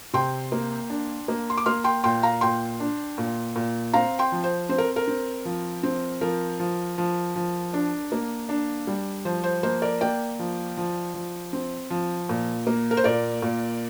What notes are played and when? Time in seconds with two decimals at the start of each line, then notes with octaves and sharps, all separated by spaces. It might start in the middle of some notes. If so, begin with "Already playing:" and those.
0.13 C3 G5 C6
0.52 A#3
0.90 D4
1.28 A#3
1.50 C6
1.58 D6
1.66 A#3 C6 F6
1.84 G5 C6
2.04 A#2 G5 C6
2.23 F5 A#5
2.41 A#2 G5 C6
2.80 D4
3.18 A#2
3.56 A#2
3.94 C4 F5 A#5
4.19 G5 C6
4.32 F3
4.44 C5
4.69 C4 C5
4.78 A#4
4.96 A#4
5.08 C4
5.45 F3
5.83 C4
6.21 F3 A#4
6.60 F3
6.98 F3
7.36 F3
7.74 D4
8.12 A#3
8.49 D4
8.87 G3
9.25 F3 C5
9.44 C5
9.63 A#3 C5
9.82 A#4 D5
10.01 A#3 D5 G5
10.39 F3
10.77 F3
11.14 F3
11.53 C4
11.90 F3
12.29 A#2
12.67 A#3
12.91 A#4
12.97 C5
13.04 A#2 A#4 D5
13.42 A#2